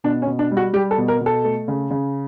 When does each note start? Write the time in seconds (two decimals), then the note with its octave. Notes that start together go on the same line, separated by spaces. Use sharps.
0.04 B2 D4
0.22 C#4
0.27 B2
0.39 D4
0.51 G3
0.57 F#4
0.73 G3 G4
0.91 A4
0.98 B2
1.08 A#4
1.21 B2
1.26 A4
1.44 A3
1.68 C#3
1.90 C#3